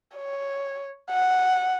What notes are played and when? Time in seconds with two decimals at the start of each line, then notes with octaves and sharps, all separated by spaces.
0.16 C#5
1.10 F#5